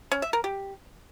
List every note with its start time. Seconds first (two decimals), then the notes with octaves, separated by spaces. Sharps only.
0.12 C#4
0.22 E5
0.33 A#4
0.44 G4